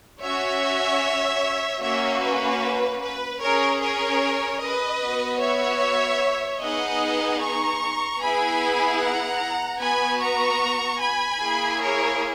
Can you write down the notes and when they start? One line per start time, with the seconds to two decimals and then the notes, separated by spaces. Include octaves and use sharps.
0.21 C#4 F#4 C#5 E5
1.81 A#3 C#4 F#4 C#5 E5
2.22 B4
3.01 B4
3.41 C#4 G#4 A#4 C#5
3.81 A#4 C#5
4.60 B4 D#5
5.02 B3 F#4
5.41 C#5 E5
6.60 B3 D#4 G#4 D#5 F#5
7.41 A#5 C#6
8.20 B3 E4 G#4 G#5 B5
9.01 F#5 A#5
9.80 B3 F#4 G#5 B5
10.20 A#5 C#6
11.00 G#5 B5
11.40 A#3 E4 G#4
11.80 A#4 C#5